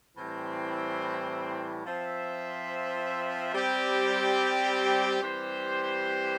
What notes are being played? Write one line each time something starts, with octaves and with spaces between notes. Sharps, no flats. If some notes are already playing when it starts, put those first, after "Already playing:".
A2 E3 G3 C4
F3 C4 F4 C5 E5
G3 C4 G4
E3 G3 C4 G4 C5